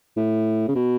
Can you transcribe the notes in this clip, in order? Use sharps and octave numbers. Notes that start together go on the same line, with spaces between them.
A2
C#3
B2